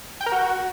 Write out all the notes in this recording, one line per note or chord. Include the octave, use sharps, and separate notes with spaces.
G5
A#4
F#4